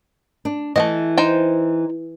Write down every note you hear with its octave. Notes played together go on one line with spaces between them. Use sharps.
D4
E3 A3 C4 D#5
D#4 C5 G5